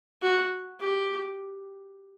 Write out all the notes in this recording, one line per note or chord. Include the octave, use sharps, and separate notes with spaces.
F#4
G4